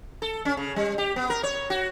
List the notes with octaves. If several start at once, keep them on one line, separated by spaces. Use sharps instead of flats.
A4
C#4
C#3
G3
G4
B3
A#4
C#5
F#4